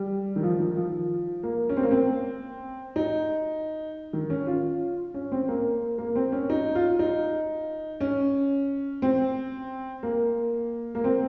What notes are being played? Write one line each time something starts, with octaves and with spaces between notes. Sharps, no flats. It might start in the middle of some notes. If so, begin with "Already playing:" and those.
Already playing: G3
D#3
F3
D#3
F3
A#3
C#4
C4
A#3
C4
D#4
D#3
C#4
F4
C#4
C4
A#3
A#3
C4
C#4
D#4
F4
D#4
C#4
C4
A#3
A#3
C4